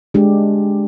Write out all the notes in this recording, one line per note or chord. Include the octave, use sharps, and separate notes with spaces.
G#3 D4 G4